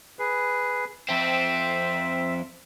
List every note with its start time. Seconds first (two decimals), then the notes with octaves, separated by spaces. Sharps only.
0.19 G#4 B4
1.09 F2 C4 E5